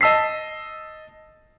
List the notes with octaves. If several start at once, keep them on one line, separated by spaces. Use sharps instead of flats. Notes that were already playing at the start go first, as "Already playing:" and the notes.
D#5 A5 E6 B6 C7